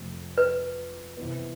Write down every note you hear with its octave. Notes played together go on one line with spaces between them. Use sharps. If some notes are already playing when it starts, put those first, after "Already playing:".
Already playing: F2 C3 F3 A3 C4
B4
C3 E3 B3